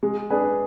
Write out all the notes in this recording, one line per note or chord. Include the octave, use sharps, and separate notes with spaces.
G#3
D4 G#4 B4